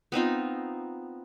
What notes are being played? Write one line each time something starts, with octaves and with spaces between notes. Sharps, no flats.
B3 C4 D#4 F4